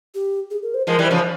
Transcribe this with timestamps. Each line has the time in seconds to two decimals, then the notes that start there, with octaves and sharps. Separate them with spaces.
0.15 G4
0.51 G#4
0.63 A#4
0.74 C5
0.87 F3 G#3 A#4
0.99 E3 G3
1.05 C5
1.11 C#3 F3